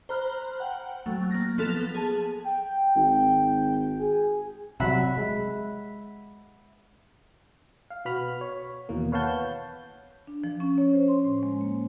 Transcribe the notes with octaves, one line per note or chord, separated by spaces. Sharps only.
C5 A#5 B5 F6 F#6
F#5 G5
F#3 A3
A#3 A#6
F3 B3 A4 A6 F7
G#4 A5
G5
G#1 G5
G#4
C3 F#3 G3 E5 F#5 B5
G#3
F5
B2 B3 F#4 B5 F6
C#5
D#2 B2 E3 A#3
B4 C#5 F5 F#5 A5 G6
D4
F3
C#4
C#5
C5
C6
A2
G#3
A#3